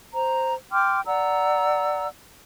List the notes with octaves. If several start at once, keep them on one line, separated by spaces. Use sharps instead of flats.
C5 A#5
G5 C6 D6 F6
D5 F#5 A#5 E6